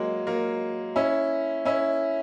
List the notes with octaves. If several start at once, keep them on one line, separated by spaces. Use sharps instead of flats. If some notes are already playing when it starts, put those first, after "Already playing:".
Already playing: F#3 G#3 A#3
F#3 A#3
C#4 E4
C#4 E4